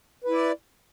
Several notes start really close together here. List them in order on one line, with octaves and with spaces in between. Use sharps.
B4 E4 D5